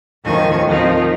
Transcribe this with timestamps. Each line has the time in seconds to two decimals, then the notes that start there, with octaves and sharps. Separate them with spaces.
0.24 D#2 A2 D#3 F3 G#5 C#6
0.66 D#3 F3 C4 D#4